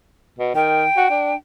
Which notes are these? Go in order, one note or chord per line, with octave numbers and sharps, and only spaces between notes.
B2
D#3 G5
F#4
D4